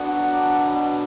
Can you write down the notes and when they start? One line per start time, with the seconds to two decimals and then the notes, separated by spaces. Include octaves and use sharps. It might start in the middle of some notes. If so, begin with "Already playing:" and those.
Already playing: D3 B3 F#4
0.13 F#3
0.33 D4
0.55 B2
0.75 B2